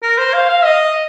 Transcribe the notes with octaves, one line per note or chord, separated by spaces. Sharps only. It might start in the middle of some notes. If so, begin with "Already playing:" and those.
A#4
C5
F5
F5
D#5